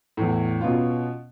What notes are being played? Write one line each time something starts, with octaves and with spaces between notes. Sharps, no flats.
E2 A2
B2 B3 C#4 F4